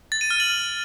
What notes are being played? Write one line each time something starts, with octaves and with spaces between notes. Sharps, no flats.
A6
D#7
F6
F#7